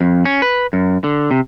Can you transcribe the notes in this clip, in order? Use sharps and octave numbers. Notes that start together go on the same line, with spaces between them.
F2
C#4
B4
F#2
D3
C3